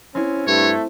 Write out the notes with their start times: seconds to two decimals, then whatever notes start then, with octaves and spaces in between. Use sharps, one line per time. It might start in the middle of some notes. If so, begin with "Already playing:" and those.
0.15 C4 C#4 E4
0.47 G2 A3 C#5